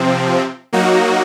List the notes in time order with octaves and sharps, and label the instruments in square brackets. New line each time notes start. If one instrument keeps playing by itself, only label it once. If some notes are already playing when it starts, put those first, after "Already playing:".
Already playing: [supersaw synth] C3 F3 C4
F#3 A#3 D#4 F#4